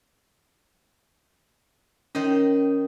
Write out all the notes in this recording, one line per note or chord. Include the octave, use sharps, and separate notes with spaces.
D#3 C#4 C5 D#5